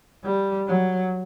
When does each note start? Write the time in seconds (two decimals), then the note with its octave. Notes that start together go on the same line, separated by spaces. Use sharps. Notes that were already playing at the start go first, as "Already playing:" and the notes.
0.24 G3
0.68 F#3